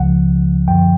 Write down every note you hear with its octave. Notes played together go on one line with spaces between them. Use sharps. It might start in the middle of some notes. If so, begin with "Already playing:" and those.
Already playing: C#2 C#3 F3 F#5
F#2 D3 F3 G5